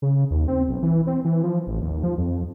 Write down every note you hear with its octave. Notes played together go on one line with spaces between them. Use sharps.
C#3
D#2
C4
B1
E3
C4
E3
F3
A1
D#2
F3
F2